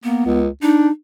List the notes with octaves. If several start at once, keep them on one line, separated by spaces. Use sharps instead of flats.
A#3 B3
C#2
D4 D#4